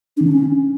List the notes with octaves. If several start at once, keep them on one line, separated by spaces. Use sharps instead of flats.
D4
D#3
D4
C#4